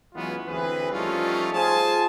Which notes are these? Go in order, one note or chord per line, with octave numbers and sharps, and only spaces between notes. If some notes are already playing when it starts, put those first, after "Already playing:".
E3 F#3 G#3 B3 C#4 F4
D2 E3 C4 G#4 B4
F3 G3 A3 C#4 D#4 F4
F4 G#4 C5 G#5 A5